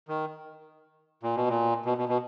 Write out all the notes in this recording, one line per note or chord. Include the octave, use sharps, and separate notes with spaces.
D#3
A#2
B2
A#2
B2
B2
B2